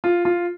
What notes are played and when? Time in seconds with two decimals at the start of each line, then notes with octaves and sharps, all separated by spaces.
0.04 F4
0.25 F4